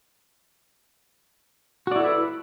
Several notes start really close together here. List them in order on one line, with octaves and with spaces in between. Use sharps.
F#4 D5 E4 A4 B4